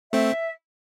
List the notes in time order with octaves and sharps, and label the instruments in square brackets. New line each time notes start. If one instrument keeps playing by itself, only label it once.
[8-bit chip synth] A3 C4 [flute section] E5